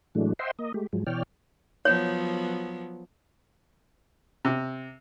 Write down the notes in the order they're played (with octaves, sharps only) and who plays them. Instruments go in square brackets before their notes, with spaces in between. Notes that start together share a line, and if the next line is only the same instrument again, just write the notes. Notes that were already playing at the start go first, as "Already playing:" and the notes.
[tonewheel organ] A2 E3 F#3 G#3 A3 D4
C5 D#5 E5 F#5 G5 C6
A#3 D#5
G#3 A3 G4
G#2 F3 F#3 G#3
B2 E3 C#5 D5 G5 F6
[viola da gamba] F3 F#3 B3 [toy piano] C#5
[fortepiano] C3